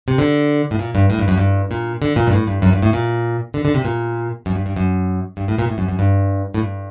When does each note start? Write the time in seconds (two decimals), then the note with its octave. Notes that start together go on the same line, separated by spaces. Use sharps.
0.08 C3
0.18 D3
0.71 A2
0.79 A#2
0.95 G2
1.10 A2
1.19 G2
1.28 F#2
1.37 G2
1.71 A#2
2.02 D3
2.16 A#2
2.27 G2
2.32 A2
2.47 G2
2.62 F#2
2.73 G2
2.82 A2
2.93 A#2
3.54 D3
3.65 D3
3.74 C3
3.85 A#2
4.46 F#2
4.56 G2
4.66 G2
4.76 F#2
5.37 G2
5.48 A2
5.59 A#2
5.68 A2
5.78 F#2
5.88 F#2
5.99 G2
6.54 A2
6.60 G2